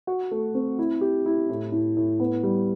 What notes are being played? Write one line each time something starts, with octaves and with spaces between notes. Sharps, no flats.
F#4
A3
C4
E4
G4
E4
A2
A2
A2
B3
G3